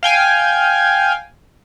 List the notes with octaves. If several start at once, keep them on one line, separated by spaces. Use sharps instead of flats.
F5 G5 G#5